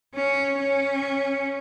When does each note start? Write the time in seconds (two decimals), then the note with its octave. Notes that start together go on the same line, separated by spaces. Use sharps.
0.14 C#4
0.58 C#4